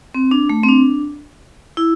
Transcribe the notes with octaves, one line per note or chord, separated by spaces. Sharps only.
C4
D4
A3
C4
D4
E4